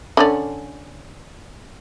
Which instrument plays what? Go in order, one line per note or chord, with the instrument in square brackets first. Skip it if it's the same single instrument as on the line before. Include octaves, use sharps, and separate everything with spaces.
[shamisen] D3 C#4 D5